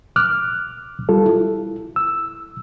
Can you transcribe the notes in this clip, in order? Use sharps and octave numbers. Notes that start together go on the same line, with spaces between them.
D6 F6 F#6
G3 F4 A4
E4
E6